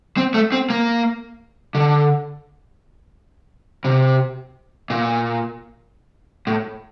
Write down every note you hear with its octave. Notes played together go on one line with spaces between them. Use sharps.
C4
A3
C4
A#3
D3
C3
A#2
A2